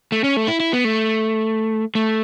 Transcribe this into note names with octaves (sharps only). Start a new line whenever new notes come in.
A3
C#4
A3
E4
E4
B3
A3
A3